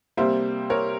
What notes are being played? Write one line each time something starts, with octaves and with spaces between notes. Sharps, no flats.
C3 G3 A#3 C5 E5
A#4 C#5